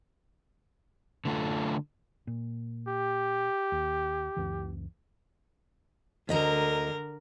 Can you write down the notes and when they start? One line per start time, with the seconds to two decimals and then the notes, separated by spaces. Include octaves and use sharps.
1.25 D3 A3 F4
2.27 A#2
2.88 G4
3.72 D#2
4.37 C#2 F#2 E3
6.29 D2 D3 A#4 D#5 A#5